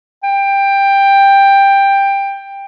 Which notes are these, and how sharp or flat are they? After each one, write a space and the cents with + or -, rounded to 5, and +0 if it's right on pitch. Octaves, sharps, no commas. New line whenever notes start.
G5 +15